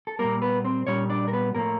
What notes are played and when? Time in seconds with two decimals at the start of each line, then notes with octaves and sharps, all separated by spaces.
0.07 A4
0.19 A#2 G3 A#3 A#4
0.42 B3 B4
0.64 C4 C5
0.87 A#2 G3 C#4 C#5
1.09 D4 D5
1.28 A#4
1.33 B3 B4
1.55 A2 F3 A3 A#3 A#4